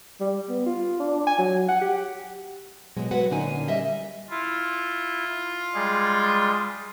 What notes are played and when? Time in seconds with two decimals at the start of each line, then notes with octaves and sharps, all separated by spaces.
0.21 G3
0.49 B3
0.66 F4
1.00 D4
1.27 G#5
1.38 F#3
1.69 F#5
1.82 G4
2.97 B2 F#3 G#3
3.11 F#3 F#4 B4 F#5
3.30 A#2 D3 A#3 C#4 D#4 G#5
3.68 G3 D#5 E5
4.30 E4 F4
5.74 G3 G#3 G#4